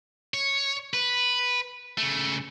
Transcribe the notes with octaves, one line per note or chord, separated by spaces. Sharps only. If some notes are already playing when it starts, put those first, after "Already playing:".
C#5
B4
C#3 A3